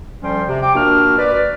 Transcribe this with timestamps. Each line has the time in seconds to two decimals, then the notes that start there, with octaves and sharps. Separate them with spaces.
0.23 D2 F3 G3 C#4 G5 C6
0.49 C3
0.62 G5 D6
0.75 A#2 A#3 D4 F#4 F6
1.19 B4 D5